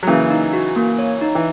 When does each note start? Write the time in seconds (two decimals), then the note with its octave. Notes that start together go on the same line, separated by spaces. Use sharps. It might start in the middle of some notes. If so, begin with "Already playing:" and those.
0.03 F#3
0.07 C#3 E3 A#3
0.30 D#4
0.53 F#4
0.76 A#3
0.99 C#5
1.22 D#4
1.35 E3